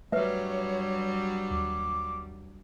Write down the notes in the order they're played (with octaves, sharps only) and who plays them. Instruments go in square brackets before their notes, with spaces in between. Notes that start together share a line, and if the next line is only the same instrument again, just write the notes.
[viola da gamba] G2 F#3 G3 [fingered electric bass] A3 [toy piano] B4 E5 [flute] C#5
[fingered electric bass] D#2 [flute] D6